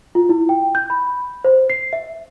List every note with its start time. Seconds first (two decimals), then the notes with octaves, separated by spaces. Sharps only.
0.15 F4
0.29 E4
0.49 G5
0.75 G6
0.90 B5
1.44 C5
1.70 C7
1.93 E5